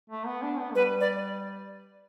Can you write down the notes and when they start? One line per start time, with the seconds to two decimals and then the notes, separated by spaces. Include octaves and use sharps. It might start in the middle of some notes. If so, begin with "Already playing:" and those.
0.10 A3
0.26 B3
0.42 D4
0.59 B3
0.75 G3 B4
1.00 D5